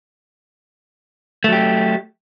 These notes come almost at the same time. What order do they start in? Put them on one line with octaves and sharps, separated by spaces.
A3 F#3 G4